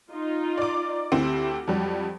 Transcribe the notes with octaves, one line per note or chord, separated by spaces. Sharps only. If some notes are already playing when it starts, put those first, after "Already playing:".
D#4 F4
D5 D6
D2 C4 E4 G4
F2 F#3 G3